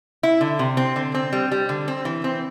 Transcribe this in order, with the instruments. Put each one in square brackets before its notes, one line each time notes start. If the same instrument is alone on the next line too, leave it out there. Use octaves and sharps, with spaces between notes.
[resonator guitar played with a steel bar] E4
D3
C3
C4
D3
C4
G3
G3
D3
C4
E3
C4